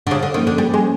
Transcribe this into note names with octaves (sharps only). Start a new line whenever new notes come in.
D3
G#2 C#3
D3
D#3 F3 A#3 C#4
D3
G#2 G3
G#3
C#4